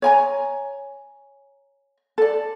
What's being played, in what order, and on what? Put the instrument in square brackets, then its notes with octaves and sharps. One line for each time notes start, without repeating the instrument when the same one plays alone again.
[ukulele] C#5 G#5 A#5
A4 D5